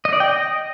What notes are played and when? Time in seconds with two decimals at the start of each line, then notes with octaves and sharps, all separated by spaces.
0.05 D#5
0.13 D5
0.20 G5
0.28 D#5